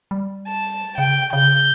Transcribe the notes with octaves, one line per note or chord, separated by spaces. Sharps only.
G3
A5
C#3 G5
C#3 G6